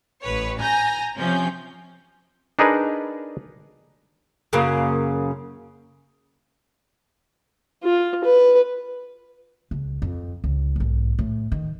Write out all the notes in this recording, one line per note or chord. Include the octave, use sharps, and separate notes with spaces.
A1 B4 C#5
G#5 A#5 G6 A#6
C3 F3 C#4 G6
D4 D#4 G#4 A#4 B4 D5
F#2 C#3 A#3
F4
B4
C#2
F2
C#2
B1 G#2
A2
D#3